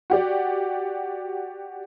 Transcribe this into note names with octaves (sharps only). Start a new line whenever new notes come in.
F#4 G4 D5